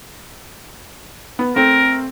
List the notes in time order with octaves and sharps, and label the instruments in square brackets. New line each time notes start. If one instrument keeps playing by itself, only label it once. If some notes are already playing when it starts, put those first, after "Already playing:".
[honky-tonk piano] B3
[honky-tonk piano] A3 C4 [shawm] A#4